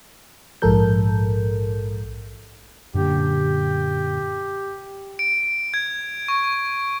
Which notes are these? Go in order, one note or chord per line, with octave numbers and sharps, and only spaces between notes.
A#1 G#2 F3 A4 A#4 G6
F#2 A#2 D3 G4
D7
G#6
C#6